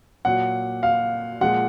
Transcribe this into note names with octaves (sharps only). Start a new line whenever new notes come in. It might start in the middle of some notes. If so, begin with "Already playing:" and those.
A#2 F#3 F#5
F5
A#2 F3 G#3 F#5